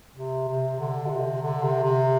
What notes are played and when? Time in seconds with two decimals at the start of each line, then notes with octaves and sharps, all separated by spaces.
0.16 C3
0.48 C3
0.79 D3
1.06 B2
1.10 C3
1.42 D3
1.63 C3
1.84 C3